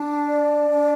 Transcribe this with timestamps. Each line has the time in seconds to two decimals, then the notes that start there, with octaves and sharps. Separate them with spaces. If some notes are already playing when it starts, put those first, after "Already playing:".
Already playing: D4
0.26 D5
0.70 D4